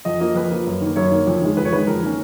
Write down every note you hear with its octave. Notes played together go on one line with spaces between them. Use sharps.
F2 D#5
F3 A#3 D#5
F2 B4
F3 A#3
F#2
D#3 A#3
F#2 C#5
D#3 A#3
F2
D#3 G#3
F2 B4
C#5
D#3 G#3 B4
F2 A#4
D#3 A#3 C#4